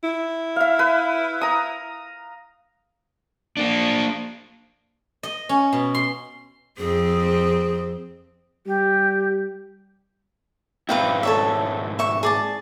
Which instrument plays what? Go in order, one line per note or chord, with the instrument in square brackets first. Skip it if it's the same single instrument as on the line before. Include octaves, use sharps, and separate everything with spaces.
[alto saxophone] E4
[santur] E5 F5
B4
A#5 D#6
[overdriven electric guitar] A#3 D4
[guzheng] D#5
C#4
B2
C6
[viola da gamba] F2 C4 [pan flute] G#4
[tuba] G3 [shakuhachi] G4
[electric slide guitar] G#2 C4 E4 [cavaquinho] B4 F5 G5
[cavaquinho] A4 C#5 E5
E5 C#6
G#4 D5 A5